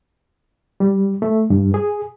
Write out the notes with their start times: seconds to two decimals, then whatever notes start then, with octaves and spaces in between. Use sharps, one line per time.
0.80 G3
1.22 A3
1.50 G2
1.74 G#4